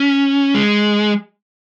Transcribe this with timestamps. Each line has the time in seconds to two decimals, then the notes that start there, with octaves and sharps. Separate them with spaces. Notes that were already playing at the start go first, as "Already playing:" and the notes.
Already playing: C#4
0.55 G#3